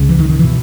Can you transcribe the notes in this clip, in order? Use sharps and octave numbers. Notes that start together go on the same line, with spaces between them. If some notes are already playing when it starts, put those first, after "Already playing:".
Already playing: C#2 C#3
E3
D#3
D#3
B2 E3